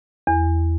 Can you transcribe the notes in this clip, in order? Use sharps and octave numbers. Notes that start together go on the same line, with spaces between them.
E2